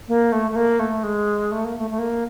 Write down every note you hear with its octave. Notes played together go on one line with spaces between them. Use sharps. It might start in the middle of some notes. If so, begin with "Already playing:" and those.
A#3
A3
A3
A#3
A3
G#3
A3
A#3
A3
A3
A#3